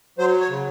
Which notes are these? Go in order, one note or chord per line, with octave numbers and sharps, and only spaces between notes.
F#3 C5
C#5
C#3